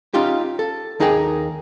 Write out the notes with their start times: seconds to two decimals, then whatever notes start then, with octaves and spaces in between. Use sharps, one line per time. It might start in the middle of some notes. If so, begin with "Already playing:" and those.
0.14 C#4 D#4 F4 G4
0.59 A4
1.00 D#2 D#4 G#4 A#4 G5